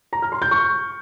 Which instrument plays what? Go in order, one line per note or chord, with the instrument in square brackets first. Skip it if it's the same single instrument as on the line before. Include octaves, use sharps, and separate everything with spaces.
[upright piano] A#5
F6
C6
G6
C#6